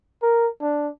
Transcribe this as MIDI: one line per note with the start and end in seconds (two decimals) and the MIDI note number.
0.23 0.47 70
0.61 0.89 62